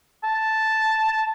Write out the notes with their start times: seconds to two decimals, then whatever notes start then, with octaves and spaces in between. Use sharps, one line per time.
0.24 A5